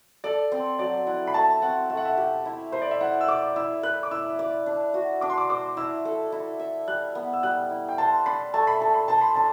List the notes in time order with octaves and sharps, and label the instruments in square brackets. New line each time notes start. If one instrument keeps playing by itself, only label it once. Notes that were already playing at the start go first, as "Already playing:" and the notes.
[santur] A4 [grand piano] D5
[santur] C4
[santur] F#3 [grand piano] D5
[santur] E4 [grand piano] F#5
[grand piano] B5
[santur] A3 [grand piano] A5
[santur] C4 [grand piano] F#5
[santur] A3 [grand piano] E5
[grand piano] F#5
E5
[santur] G4
E4
[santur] B4 [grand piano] C5
[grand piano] D5
E5
[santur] E4 [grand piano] F#5
[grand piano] E6
[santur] D5 [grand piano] D6
[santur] E4 [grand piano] E6
[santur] B4 [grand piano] F#6
[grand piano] D6
[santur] E4 [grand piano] E6
[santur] D5
D4
F#4
[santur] D4 [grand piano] D6
[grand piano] C6
D6
[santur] C5 [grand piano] D6
[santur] E4 [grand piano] E6
[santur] A4
E4
E5
[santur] G3 [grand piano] F#6
[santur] B3
[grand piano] E6
[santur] G3 [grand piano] F#6
[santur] E4
[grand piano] G5
[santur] C5 [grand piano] A5
[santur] D4 [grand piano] B5
[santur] A3 [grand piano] A5
[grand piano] B5
[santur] A4 [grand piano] A5
[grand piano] B5
[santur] C5 [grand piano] A5
[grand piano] B5
[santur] D4 [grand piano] A5